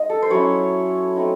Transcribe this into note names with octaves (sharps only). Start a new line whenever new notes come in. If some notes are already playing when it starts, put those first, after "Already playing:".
Already playing: G#3 D#4 D#5
A4
C5
F#3 C#4 E4 C#5
A3 C4 D#4